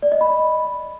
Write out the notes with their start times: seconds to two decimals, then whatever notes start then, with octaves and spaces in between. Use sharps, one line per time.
0.02 D5
0.12 D#5
0.21 B5